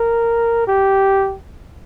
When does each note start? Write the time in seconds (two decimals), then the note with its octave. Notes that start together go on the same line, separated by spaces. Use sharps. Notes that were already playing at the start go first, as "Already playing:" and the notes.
Already playing: A#4
0.68 G4